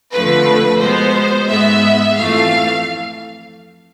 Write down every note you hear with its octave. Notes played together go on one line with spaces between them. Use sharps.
F2 D3 F3 A3 B4
B2 G#3 B3 C5
G#2 G#3 B3 E5
F2 E3 A3 F5